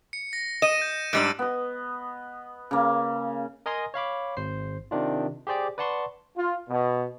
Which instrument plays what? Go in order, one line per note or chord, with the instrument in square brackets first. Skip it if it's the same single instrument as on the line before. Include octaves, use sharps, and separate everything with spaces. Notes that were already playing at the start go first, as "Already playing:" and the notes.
[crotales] C#7
A#6
[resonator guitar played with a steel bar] D#5 [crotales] A#6 D#7 E7
[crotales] G6
[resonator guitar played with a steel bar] G#2 G3 D4 [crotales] E6 A6 D7
[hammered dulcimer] B3 D#5
C#3 A#3
[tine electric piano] A#4 D#5 G#5 A#5 C6 D#6
C#5 F5 B5 D6
G#1 C5 C7
C3 D#3 D4 F4
G4 G#4 C5 D5 G5
B4 D5 F#5 A5 C6 C#6
[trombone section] F4
B2